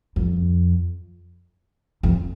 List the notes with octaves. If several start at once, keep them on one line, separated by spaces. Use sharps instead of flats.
F2
F2